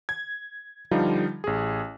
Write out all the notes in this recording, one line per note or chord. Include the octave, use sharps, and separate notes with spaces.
G#6
D3 F3 G3 D#4 F4
A1 G#4